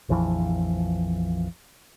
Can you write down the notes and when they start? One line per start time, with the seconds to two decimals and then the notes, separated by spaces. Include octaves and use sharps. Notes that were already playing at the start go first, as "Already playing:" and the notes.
0.09 A#1 F2 E3 F3